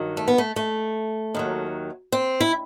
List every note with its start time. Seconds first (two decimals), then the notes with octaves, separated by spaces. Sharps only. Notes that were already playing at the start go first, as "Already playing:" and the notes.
Already playing: G2 D#3 F#3
0.17 A3
0.28 B3
0.38 A3
0.56 A3
1.35 D#2 D#3 F#3
2.12 C4
2.40 E4